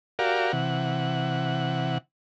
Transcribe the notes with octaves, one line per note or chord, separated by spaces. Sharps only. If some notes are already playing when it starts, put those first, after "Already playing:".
F#4 G4 A#4 D5 F5
C3 E3 F#5